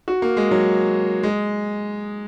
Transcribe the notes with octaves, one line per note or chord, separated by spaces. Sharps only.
F#4
A#3
G#3
F#3
G#3